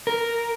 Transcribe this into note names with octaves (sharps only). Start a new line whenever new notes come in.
A#4